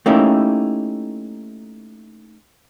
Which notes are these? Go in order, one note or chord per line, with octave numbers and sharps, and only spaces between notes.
A3 A#3 C#4 D#4 E4 G4